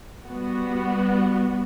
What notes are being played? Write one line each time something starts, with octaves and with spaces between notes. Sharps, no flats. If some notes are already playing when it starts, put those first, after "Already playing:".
G3 B3 F#4